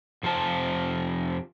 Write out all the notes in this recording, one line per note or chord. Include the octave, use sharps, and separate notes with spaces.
F2 C3 F3 A5